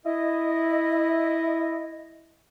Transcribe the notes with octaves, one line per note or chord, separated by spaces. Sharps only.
E4 D#5